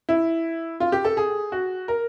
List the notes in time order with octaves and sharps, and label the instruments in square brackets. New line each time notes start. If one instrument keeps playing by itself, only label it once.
[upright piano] E4
F4
G4
A4
G#4
F#4
A#4